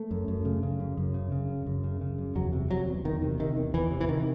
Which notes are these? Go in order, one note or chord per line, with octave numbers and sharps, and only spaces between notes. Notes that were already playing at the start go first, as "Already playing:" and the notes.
Already playing: A3
F#2
F#2
C#3
C#3
F#2
F#2
C#3
C#3
F#2
F#2
C#3
C#3
F#2
E2 F#3
C3
C3 F#3
E2
E2 D#3
C3
C3 D#3
E2
E2 E3
C3
E3
C3 D#3